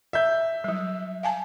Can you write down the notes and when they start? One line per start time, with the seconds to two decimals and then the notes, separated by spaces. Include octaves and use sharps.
0.13 E5 G6
0.64 F#3 G3
1.23 F5 G#5 A5